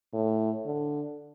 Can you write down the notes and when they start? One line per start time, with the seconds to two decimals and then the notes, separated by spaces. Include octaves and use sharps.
0.14 A2
0.66 D3